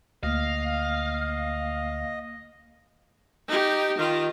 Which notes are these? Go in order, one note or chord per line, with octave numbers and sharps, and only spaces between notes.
D2 A#3 D#5 F5
D#4 G4
D#3 F4